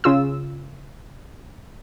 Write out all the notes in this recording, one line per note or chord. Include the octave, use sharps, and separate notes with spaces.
C#3 F4 E6